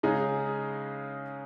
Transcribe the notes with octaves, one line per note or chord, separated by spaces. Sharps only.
C#3 G#3 D#4 G#4